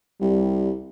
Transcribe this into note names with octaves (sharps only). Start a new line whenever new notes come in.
C2 G3